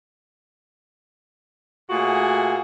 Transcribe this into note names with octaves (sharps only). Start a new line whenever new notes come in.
A#2 A3 F4 F#4 G#4